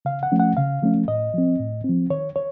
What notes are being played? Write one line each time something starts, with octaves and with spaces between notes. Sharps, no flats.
C#3 F5
F#5
F3 A3 C#4
F#5
C#3 F5
F3 A3 C#4
A2 D#5
F3 C4
A2
F3 C4
D#3 C#5
C#5